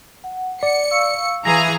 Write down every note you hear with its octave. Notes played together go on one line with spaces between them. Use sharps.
F#5
D5 C#7
F5 C#6 E6
E3 G#4 A#5 A#6